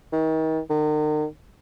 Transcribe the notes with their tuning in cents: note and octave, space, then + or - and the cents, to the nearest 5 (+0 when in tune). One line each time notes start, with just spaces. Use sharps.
D#3 +35
D#3 -40